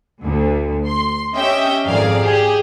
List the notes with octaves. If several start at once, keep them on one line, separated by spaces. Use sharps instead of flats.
D2
C6
C#4 G4 D#5 E5 G5
G#1 F2 G#4 A#4 D5 F5
G4 G#4